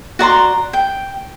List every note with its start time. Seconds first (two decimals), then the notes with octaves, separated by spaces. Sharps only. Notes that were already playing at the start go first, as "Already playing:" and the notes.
0.19 F#4 D5 A#5 C6
0.73 G5